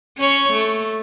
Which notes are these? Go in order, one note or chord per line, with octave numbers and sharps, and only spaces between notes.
C#4 C#5
A3